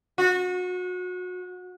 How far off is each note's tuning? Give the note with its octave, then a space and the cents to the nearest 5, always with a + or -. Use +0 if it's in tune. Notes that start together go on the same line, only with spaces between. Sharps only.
F#4 -30